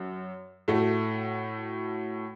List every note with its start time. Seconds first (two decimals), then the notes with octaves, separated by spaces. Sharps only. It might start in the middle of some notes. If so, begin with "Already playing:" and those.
Already playing: F#2 F#4
0.68 A2 A3 F#4